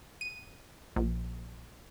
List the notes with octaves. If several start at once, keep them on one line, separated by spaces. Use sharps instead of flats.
D#7
A#1